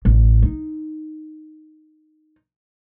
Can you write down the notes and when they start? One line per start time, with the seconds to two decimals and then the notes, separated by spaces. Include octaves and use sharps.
0.05 A1
0.43 D#4